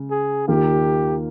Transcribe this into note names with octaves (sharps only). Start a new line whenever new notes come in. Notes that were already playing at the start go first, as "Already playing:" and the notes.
Already playing: C#3 G#3
G#4
D#2 D#3 A#3 F4 G4